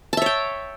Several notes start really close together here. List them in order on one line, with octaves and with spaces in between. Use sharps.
A5 E5 C#5 G5